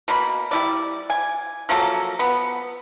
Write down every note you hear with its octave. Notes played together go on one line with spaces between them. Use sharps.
B2 A#3 B5
G3 E4 D5
G#5
F3 F#3 A#3 A4
B3